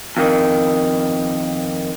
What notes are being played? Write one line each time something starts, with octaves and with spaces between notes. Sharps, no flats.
F2 D#3